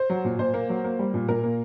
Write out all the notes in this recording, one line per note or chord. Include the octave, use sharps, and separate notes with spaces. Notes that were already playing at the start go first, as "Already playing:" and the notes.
Already playing: C5
F#3
A#2
A#2 C5
A#3
F#3
A#3
G3
A#2
A#2 A#4
A#3